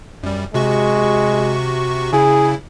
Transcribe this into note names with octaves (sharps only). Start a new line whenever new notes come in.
F#2 G3
C3 G#3 F#4 C#6
C#3 E4 G#4